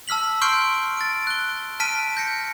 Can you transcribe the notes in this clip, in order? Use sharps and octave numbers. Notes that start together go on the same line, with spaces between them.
A5 E6 F6 B6 F#7
C6 C#6 F6 G6 C7 D7
A6 D7
F#6 G7
A5 F6 B6 D7 D#7
G6 A#6 C#7